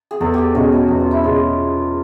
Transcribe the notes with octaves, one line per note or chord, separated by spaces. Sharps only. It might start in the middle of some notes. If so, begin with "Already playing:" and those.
G#4
E2 A4
G4 G#4
B2 G#3 C#4 F#4
F#4
E2 F#4
F4
E4
B2 G#3 C#4 F4